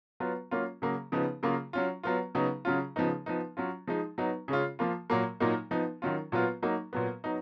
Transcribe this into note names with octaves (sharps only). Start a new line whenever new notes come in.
F#3 B3 F4
F#3 A#3 C#4 F4
C#3 F#3 A#3
C#3 F3 B3 D#4
C#3 F#3 A#3 F4
F#3 C#4 F4
F#3 B3 F4
C#3 F#3 B3 D#4
C#3 F#3 C#4 F4
C#3 F3 B3 D#4
F3 B3 D#4
F#3 C#4 F4
F3 G#3 D#4
F#3 B3 D#4
C#3 G#3 C#4 F4
F3 A#3 F4
A#2 F#3 A#3
A#2 F#3 A#3 D#4
F3 B3 D#4
D#3 F#3 C#4 F4
A#2 F#3 B3 F4
F#3 A#3 D#4
A#2 F#3 B3
F#3 B3 D#4